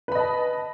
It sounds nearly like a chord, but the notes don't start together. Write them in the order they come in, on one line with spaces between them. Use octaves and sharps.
B4 B5 D#5 A5